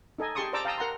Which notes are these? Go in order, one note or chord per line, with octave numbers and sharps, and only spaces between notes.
D#4 A4 D#5 G#5
G4 G#4 A5 C6 C#6 D#6
C5 D5 A5 A#5 D6 E6
F5 G5 A5 A#5 D#6 E6
A#4 F#5 A#5 C6